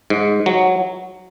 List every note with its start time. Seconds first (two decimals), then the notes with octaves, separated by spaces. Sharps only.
0.10 G#2
0.46 F#3